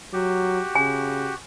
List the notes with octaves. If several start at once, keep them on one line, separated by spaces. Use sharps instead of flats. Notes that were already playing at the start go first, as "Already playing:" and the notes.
F#3 F#4 G4
C#3 G#5